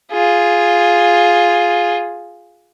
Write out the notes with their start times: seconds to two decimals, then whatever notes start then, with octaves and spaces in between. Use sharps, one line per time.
0.11 F4 G#4